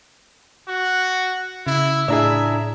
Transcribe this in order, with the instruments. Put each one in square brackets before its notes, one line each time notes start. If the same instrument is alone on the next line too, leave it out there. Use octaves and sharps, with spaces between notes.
[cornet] F#4
[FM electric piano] C#3 [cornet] E4
[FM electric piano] A2 A#5 [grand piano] D4 E4 G#4 [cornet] E5